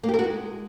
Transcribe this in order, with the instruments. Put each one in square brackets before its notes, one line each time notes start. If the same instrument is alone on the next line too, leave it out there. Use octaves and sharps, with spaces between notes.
[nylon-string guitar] A#3
G4
A#4
F#4
G#3